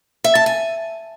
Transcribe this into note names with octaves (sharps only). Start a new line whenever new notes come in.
E5
A5
G#5